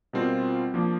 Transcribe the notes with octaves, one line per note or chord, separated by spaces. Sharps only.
B2 G3 C4 F4 A#4
F3 A#3 D4